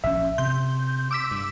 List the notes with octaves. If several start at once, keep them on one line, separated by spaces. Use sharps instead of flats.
A#1 C#4 E5
C3 C6 G6
D6 E6 B6
G2